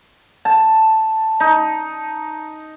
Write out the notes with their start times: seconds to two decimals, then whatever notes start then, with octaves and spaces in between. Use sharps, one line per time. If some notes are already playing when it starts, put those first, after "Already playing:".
0.45 A5
1.40 D#4